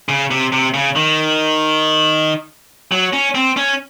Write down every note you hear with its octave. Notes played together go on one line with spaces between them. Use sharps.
C#3
C3
C3
C#3
D#3
F#3
C#4
C4
C#4